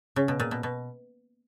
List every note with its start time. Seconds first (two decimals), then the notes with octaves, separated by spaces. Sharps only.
0.16 C#3
0.28 B2
0.40 A#2
0.51 B2
0.63 B2